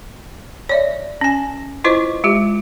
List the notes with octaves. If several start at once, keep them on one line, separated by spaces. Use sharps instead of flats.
C#5 D5 E5
C#4 G#5
E4 F4 B4 C5 D#5 C#6
G#3 F4 G4